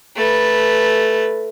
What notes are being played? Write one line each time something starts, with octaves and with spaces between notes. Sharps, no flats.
A3 B4